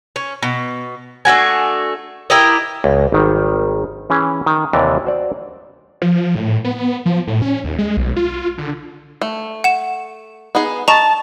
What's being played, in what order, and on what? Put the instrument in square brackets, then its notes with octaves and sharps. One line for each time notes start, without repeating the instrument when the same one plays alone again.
[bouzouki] C#4
B2
A3 D4 F#4 G#5
E4 G4 A#4 D#5
[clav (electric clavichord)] C#2
G#1 D#3 G3
E3 C#4 G#4
D#3
D#2 C3 E3 D5 A#5
F#4 C5 D5
[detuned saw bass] F3
A2
B3
F3
A2
C#4
D#2
G#3
B1
F4
D3
[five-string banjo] A3
[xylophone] F#5 E7
[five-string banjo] B3 D#4 G#4
[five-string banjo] D#5 [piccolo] A5 [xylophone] A#5 C#6 E7